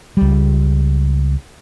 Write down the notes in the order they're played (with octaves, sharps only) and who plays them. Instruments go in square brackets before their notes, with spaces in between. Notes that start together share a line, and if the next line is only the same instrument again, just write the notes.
[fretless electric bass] C#2 G3